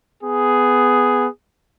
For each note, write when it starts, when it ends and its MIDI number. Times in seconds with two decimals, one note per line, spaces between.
0.23 1.27 59
0.23 1.27 68